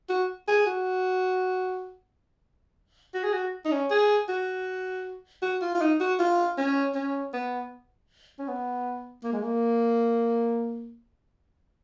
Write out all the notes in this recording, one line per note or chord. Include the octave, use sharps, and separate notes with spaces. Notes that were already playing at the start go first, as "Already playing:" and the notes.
F#4
G#4
F#4
F#4
G#4
F#4
D#4
C#4
G#4
F#4
F#4
F4
F4
D#4
F#4
F4
C#4
C#4
B3
C#4
B3
A#3
G#3
A#3